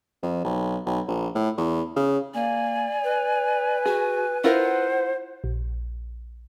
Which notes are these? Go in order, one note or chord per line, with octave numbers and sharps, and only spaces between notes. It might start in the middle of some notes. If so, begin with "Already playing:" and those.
F2
B1
B1
A#1
A2
E2
C#3
A#3 D5 G#5
B4
F#4 G#4
E4 F4 A#4 C5 F#5
A#1